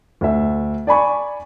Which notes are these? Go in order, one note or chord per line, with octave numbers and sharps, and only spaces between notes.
D2 E5
D5 G#5 B5 C#6